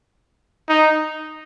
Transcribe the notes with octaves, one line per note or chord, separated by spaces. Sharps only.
D#4